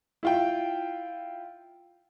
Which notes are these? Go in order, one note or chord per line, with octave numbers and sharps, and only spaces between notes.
E4 F4 G5